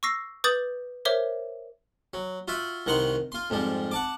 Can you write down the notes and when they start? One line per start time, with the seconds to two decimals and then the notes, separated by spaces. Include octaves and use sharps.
0.03 C#6 D6 E6 A#6 C7
0.44 B4 D6 D#6 G6 A6 F#7
1.05 A#4 C5 C#5 E5 D6 G7
2.14 F#3
2.48 F4 F#4 E5
2.86 C2 D#3 F#5 A#5 C6 C#6
3.32 F4 C6
3.50 F2 G#2 F3 G3
3.91 F#5 A5 D6